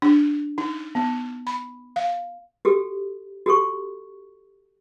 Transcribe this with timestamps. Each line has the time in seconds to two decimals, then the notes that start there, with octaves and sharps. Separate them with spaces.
0.02 D4
0.58 D#4
0.95 B3
1.47 B5
1.96 F5
2.65 F#4 G4 A4
3.46 F#4 G4 A4 C#6